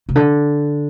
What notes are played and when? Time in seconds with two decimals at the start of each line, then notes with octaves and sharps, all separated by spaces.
0.09 C3
0.16 D3